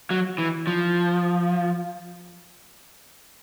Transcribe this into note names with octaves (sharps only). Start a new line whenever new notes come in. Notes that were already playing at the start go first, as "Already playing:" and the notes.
F#3
E3
F3